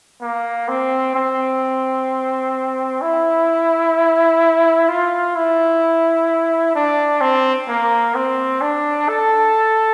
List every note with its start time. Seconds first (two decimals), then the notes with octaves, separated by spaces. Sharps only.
0.22 A#3
0.68 C4
1.15 C4
3.02 E4
4.89 F4
5.35 E4
6.75 D4
7.21 C4
7.69 A#3
8.15 C4
8.61 D4
9.08 A4